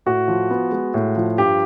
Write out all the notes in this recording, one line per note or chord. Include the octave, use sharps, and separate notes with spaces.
A2 F#4
F3
B3
G#3
A2
F3
G2 G4